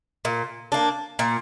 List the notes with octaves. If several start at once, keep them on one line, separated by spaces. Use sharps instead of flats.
A#2
A#3 D4
A#2